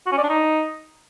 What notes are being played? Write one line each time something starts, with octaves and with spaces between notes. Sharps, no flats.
F#4
C#4
D5
D4
D#4